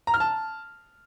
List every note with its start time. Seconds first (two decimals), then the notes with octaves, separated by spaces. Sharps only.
0.07 A#5
0.14 F6
0.20 A5